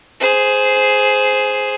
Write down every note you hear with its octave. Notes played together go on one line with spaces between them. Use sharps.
G#4 C5